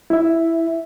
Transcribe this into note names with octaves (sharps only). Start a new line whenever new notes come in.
E4 E5